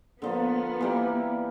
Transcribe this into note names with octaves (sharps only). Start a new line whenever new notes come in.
D3 F3 A#3 B3
E3 G3 A#3